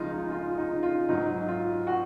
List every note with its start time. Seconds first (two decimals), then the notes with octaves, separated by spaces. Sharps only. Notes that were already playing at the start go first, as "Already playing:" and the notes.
Already playing: C#2 C#3 F3 G#3 D#4 F4
0.12 D#4
0.31 F4
0.58 D#4
0.83 F4
1.09 G#2 F#3 D#4
1.48 F4
1.87 F#4